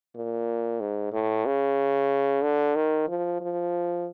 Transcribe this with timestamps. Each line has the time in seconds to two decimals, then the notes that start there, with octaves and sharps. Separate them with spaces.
0.15 A#2
0.80 G#2
1.12 A2
1.46 C#3
2.42 D3
2.75 D#3
3.08 F3
3.40 F3